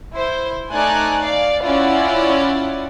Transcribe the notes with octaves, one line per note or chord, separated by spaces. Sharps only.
E4 C5
A3 D#4 D5 G#5 A#5 F#6
D5 F5
C#4 E4 F4 D5 F#5